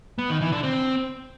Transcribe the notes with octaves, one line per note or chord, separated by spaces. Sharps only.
B3
D#3
E3
D3
C4